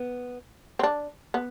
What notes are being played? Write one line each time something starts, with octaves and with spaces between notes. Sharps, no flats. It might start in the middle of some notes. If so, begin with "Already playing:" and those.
Already playing: B3
C4
D4
B3